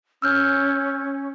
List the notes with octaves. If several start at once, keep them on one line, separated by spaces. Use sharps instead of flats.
C#4 E6 F6 G6